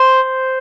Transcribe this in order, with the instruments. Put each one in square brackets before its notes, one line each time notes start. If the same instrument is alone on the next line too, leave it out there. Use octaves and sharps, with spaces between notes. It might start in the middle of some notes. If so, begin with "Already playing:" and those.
Already playing: [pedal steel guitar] C5